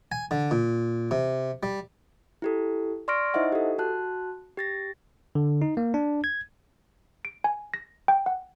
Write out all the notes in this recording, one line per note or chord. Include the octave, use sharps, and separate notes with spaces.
G#5
D3
A#2
C3
G3
E4 G4 A4
D5 C6 C#6 F6 A#6 D7
D#4 E4 C5 D#5 E5 F#5
G4 A4
F#4 A5 F#6
G4 A6 A#6
D3
D#4
A#3
D4
G#6
D7
G#5
A#6
G5
F#5